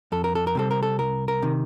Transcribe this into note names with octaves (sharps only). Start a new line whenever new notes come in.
F2 A4
A#4
A4
A#4
C3 G3 C4 A4
A#4
A4
C2 A#4
A#4
C3 D#3